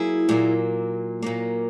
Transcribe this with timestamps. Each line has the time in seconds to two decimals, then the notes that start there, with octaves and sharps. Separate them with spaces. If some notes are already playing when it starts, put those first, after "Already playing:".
Already playing: F#3 A#3 E4 G#4
0.29 A#2 F#3 A#3
1.22 A#2 F#3 A#3